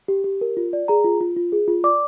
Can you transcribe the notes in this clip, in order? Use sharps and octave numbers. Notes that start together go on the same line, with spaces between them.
G4
G4
A#4
F4
D5
G#4 A#5
F4
F4
F4
G#4
F4
D5 D6